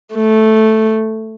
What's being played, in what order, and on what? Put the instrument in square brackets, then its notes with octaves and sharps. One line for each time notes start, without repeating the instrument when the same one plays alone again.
[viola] A3